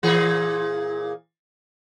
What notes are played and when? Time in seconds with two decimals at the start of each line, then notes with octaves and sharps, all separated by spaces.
0.03 A#2 E3 G#4